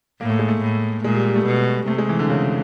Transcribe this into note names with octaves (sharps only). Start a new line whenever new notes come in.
A2 A#3
A3
G#3
A3
A2
A#2 G#3
G3
G3
A3
B2
C3 A3
G#3
E3
D3
C#3